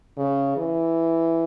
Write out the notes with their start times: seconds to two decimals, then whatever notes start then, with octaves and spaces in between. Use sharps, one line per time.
0.17 C#3
0.57 E3